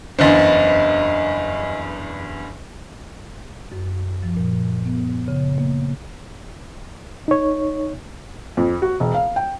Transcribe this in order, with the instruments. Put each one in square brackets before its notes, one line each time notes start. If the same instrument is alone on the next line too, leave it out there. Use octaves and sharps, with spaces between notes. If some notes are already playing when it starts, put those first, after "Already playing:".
[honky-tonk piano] F#1 E2 G2 [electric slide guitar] C5 D#5
[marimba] F#2
F3
A#2
B3
C#3
A#3
[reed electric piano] D#4 C#5
[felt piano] F2
F#4
E1
F5
G5